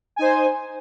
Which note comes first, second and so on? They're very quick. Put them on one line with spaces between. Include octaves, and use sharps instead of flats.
G#5 D#4 C5